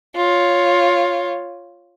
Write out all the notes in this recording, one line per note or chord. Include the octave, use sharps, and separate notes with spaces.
F4 C#5